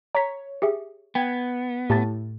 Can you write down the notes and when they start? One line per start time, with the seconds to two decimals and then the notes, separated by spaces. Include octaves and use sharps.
0.15 C#5 A#5 B6
0.62 G4 G#4 E5
1.15 B3 G5 G#6
1.90 A2 G4 A5 A6